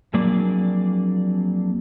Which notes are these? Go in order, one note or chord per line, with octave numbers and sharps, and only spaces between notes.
F2 F#3 A#3 D4 G#4 D5